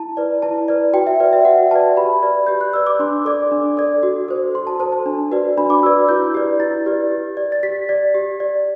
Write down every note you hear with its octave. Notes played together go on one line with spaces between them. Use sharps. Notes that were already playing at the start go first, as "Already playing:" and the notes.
Already playing: E4 A5
B4 D5
E4 A5
B4 D5
F#4 G5
E5
B4 D5
E5
F#4 F#5
B4 D5 A5
G4 B5
B4 D5
G4 G6
F#6
B4 D5 E6
D6
D4 C6
A4 D5 D6
D4
A4 D5
F#4
A4 C5
F#4 C6
A5
A4 C5 A5
A5
D4
F#4 B4 D5
D4 B5
D6
F#4 B4 D5 E6
E4 G6
G4 B4 D5
E4 A6
G4 B4 D5
G4
D5
A6
G4 B6
D5
G4
D5